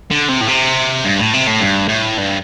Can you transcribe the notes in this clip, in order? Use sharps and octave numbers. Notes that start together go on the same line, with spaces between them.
D3
C3
A2
C3
G2
A2
C3
A2
G2
A2
G2